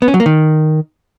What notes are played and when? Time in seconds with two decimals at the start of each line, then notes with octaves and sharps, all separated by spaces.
0.02 B3
0.08 C#4
0.14 F#3
0.20 A#3
0.26 D#3